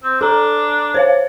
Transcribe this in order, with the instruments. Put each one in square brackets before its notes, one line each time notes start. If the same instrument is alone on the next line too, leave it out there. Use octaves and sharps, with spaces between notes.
[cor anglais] C4
[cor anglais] D4 [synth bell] A4 A#5
[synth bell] C5 C#5 F5